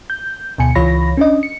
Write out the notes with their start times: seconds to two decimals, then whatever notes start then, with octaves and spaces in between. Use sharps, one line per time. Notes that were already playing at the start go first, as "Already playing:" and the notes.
0.10 G6
0.58 D2 B2 G#5 C#7
0.75 C#2 E3 F4 C#5 B5 A#6
1.17 C#4 D4 D#5
1.43 C#7